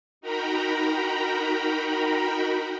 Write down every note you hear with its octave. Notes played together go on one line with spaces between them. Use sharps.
D#4 F#4 A#4 G5 A#5 B5